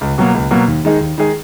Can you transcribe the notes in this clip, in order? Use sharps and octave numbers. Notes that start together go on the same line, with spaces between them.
C#2
B2 F#3 A#3
C#2
B2 F#3 A#3
D#2
D#3 G#3 D#4 G#4
D#2
D#3 G#3 D#4 G#4